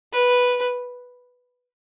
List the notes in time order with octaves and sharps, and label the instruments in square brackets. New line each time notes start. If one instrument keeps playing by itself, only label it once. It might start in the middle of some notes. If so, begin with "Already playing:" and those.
[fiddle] B4